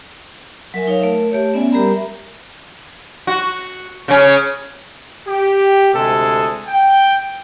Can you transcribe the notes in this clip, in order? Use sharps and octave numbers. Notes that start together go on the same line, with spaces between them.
F#3 A#4 E5 G#5
D#4 C#5 F5
A3 A#4 E5
A3 G4 C#5
B3 C#4 D5 E5 G#5
G3 G4 A#4 E5 A#5 B5
F#4
C#3 C#4
G4
D2 C3 G#3 G#4 A4
G5